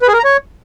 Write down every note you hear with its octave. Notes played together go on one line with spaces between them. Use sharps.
B4
G#4
A#4
A#5
C#5